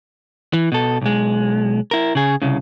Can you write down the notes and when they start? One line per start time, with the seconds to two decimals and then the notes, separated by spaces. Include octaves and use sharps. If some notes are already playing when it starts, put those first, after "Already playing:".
0.53 E3
0.72 B2 A4
1.01 B1 G#3
1.91 E4 A#4
2.15 C#3 G#4
2.42 C2 C#3